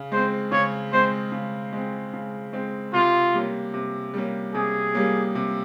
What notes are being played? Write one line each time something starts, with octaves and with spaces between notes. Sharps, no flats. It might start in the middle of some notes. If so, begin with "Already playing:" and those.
Already playing: C#3
G#3 C4 C5
C#3 C#5
G#3 C4 C5
C#3
G#3 C4
C#3
G#3 C4
C3 F4
G3 A#3 C#4
C3
G3 A#3 C#4
C3 G#4
G3 A#3 C#4
C3